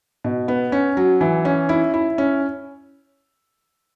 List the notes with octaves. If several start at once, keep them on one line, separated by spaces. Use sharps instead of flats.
B2
B3
C#4
F#3
E3
C#4
E4
E4
C#4